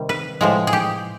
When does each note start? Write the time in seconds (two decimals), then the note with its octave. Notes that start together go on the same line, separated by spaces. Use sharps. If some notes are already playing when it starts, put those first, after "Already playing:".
Already playing: C3 D#3 G3
0.09 B4
0.41 A2 F3 G#3
0.67 G#4
0.73 G4